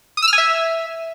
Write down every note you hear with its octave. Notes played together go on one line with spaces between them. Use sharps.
D#6
E6
F6
G#5
E5